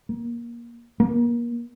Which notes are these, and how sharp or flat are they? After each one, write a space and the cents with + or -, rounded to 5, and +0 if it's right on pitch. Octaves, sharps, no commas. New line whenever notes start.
A#3 +20
A#3 +30